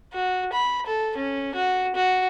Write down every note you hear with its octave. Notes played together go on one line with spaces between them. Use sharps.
F#4
B5
A4
C#4
F#4
F#4